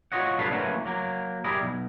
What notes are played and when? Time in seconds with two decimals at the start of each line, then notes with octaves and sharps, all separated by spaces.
0.12 F4 F#4 C#5 D#5 F#5
0.39 C2 D4 A4 B4 F5
0.51 E3 F#3 A3 A#3 C#4 F#4
0.85 F#3 A#3
1.44 G3 E4 G#4 A#4
1.61 B1